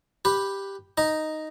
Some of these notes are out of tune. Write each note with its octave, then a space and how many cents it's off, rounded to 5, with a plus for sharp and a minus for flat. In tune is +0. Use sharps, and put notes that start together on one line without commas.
G4 +5 B4 +0
D#4 +0 D#5 +0